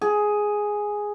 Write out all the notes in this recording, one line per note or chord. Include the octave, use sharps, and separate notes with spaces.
G#4